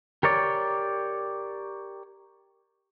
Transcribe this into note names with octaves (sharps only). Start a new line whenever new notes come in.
G4 A#4 C#5 D5